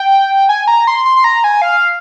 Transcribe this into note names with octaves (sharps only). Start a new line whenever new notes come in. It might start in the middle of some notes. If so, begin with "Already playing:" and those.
Already playing: G5
G#5
A#5
C6
C6
C6
A#5
G#5
F5